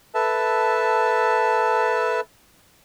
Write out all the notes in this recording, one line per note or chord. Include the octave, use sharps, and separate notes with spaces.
A4 B4 E5 A5